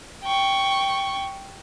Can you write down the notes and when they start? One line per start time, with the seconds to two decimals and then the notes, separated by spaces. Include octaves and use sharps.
0.24 G5 C#6